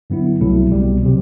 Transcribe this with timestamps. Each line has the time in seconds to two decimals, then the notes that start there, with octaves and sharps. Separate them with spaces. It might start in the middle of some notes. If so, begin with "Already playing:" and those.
0.10 G2 D3 F#3 B3 E4
0.41 C2 B2 F#3 A3 E4
0.72 C2 B2 G3
1.03 C3 F#3